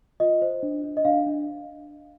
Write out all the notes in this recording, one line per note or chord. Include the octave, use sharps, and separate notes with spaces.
F4 D#5
C5
D4
D4
D#5
D4 F5
D4